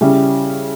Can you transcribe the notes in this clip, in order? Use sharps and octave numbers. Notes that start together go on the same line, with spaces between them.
C#3 G3 C#4 E4